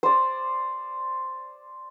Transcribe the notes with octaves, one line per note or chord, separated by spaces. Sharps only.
C5 D5